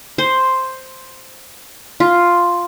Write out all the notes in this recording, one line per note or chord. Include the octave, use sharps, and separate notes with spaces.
C5
F4